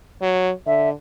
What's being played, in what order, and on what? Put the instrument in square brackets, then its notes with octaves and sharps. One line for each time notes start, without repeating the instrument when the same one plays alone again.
[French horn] F#3
[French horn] D3 [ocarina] E5